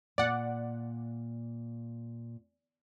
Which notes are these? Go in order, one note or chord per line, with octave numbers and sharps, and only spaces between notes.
A#2 D5 F#5